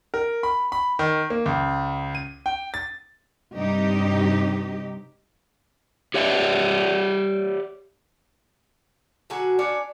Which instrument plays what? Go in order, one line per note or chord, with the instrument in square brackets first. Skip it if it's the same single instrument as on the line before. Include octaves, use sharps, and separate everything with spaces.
[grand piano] A#4
B5
B5
D#3
A#3
C#2
D#7
G5
A6
[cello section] G2 C3 D#4 G4
[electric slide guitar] G4 C#5 D5 E5
[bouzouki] D3 F#3 F#4 G#4
C#4 D4 C#5 D5